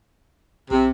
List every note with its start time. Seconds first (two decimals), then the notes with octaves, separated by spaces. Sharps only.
0.71 B1 C3